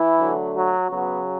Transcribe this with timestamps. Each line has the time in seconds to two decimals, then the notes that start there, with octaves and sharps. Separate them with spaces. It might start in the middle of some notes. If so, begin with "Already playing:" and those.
Already playing: E3 E4
0.20 D3 F#3 A3
0.54 F#3 F#4
0.89 C#3 F#3 B3